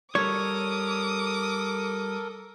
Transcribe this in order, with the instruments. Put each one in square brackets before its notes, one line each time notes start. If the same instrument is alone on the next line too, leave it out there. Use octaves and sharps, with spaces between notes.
[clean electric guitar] G3 [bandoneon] A4 A#4 [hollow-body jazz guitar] C#5 [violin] D6 D#6